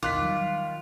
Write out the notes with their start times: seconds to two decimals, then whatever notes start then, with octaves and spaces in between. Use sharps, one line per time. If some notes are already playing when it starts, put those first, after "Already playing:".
0.03 B1 E2 D#3 F4 D6 F#6 B6
0.22 F#3 G3